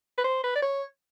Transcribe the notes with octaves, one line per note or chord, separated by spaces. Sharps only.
B4
C5
B4
D5
C#5